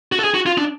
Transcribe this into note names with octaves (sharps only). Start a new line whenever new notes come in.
F#4
A4
G#4
F#4
F4
D4